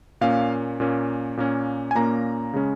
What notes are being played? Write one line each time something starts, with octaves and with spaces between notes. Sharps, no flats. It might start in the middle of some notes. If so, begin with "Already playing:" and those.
A#2 A#3 C#4 F5
A#2 A#3 C#4
A#2 A#3 C#4
G#5
A#2 A#3 C#4 A#5
C#3 G#3 C#4